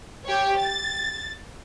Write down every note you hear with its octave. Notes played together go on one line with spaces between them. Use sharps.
G4 C#5
A6